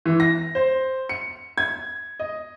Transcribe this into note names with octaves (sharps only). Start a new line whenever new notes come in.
E3
A#6
C5
C#7
G#6
D#5